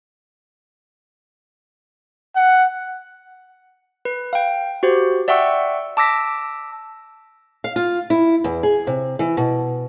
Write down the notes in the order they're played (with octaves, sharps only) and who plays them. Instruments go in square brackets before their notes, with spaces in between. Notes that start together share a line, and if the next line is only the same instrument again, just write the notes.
[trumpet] F#5
[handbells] B4
F5 G5
F#4 G4 C5
D5 E5 F#5 G5 C#6 E6
A5 D6 E6 A#6 B6
[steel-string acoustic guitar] F5
F4
E4
E2
G#4
C3
E3
B2